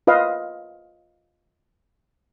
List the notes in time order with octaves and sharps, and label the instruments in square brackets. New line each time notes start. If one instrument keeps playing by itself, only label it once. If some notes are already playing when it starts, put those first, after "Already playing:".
[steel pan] F4 B4 D#5 F5